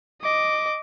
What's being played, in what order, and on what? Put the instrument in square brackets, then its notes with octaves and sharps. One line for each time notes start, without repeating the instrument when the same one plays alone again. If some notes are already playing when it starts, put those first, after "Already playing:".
[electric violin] D#5 D6